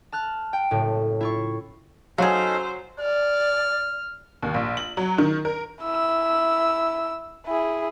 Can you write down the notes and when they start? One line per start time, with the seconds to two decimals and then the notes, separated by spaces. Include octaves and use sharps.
0.12 A5 F6 F#6
0.53 G5
0.71 F#1 A2
1.21 E4 F4 C#6
2.18 F#3 C#4 D#4 G#4 A4 C5 F5
3.00 D5 F6
4.43 D#2
4.54 A#1
4.77 F#7
4.97 F#3
5.18 D#3
5.45 A#4
5.82 E4 E6
7.46 E4 G#4